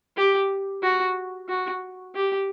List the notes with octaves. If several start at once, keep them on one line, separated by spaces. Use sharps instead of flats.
G4
F#4
F#4
G4